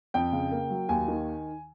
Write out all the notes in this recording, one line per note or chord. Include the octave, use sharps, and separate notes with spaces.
F2 G5
C#3
A#3
F#3
D#2 G#5
D#3